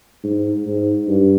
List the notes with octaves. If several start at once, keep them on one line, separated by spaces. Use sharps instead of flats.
G#2
G#2
G2